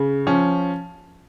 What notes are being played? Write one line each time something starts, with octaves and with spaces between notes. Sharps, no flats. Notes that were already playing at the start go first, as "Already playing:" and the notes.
Already playing: C#3
F3 C#4